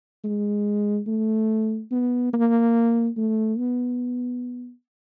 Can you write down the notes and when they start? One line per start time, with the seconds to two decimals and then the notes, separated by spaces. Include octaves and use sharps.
0.24 G#3
1.07 A3
1.91 B3
2.33 A#3
3.17 A3
3.58 B3